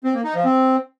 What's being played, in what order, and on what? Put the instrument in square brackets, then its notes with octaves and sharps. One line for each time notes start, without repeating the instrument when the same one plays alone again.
[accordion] C4
A#3
D#4
F3
C4